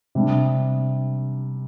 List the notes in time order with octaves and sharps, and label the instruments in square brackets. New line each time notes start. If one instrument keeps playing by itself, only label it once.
[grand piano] C3 G3 D4